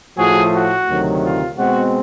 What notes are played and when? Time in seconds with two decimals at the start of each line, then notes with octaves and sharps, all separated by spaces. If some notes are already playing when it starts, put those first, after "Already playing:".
0.18 A2 F3 A3 F#4 G#4
0.53 F#4
0.88 D2 C3 D#3 F#3
1.22 F4
1.57 B2 G#3 C4 F#4